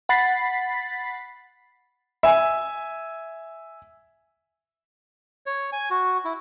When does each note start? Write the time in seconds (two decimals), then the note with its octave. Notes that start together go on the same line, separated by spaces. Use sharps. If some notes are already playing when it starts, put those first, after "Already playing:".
0.09 F#5 B5 A6 B6 C7
2.23 E5 G#5
5.46 C#5
5.73 G#5
5.90 F#4
6.25 E4